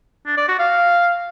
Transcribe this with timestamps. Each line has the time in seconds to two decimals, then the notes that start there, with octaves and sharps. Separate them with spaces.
0.27 D4
0.37 D5
0.48 F#4
0.59 F5